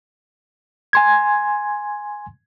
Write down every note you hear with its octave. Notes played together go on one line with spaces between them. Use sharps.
G#5 C6 G#6